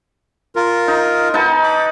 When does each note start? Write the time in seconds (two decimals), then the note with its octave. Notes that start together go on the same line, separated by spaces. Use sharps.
0.56 F4 A#4
0.88 D#4
1.34 B3 D#4 B4 A5
1.63 B5 D6